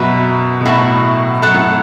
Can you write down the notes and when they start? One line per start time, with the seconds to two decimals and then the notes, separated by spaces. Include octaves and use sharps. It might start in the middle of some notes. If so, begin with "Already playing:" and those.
Already playing: F#2 B2 F#4 B4 E5
0.61 B2
0.65 A2 F#4 B4 E5 A5
1.42 F#2 A4 F#5 A5
1.54 A2